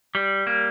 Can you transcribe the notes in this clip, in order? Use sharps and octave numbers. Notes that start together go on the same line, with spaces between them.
G3
A#3